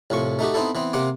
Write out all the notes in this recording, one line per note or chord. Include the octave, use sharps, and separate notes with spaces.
C2 A2 F3 C#6
A3 D#4 F#4 G4
B3 C4 D#4 E4 A4
E3 B3 C4
C3 A#3 C4 F#5 D6